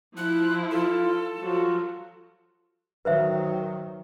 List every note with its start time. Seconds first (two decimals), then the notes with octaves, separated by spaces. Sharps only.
0.17 F3 E4 F#6
0.71 F4 A4
1.43 F3 F#3 F4 F#4
3.05 D#3 F#3 B4 C5 E5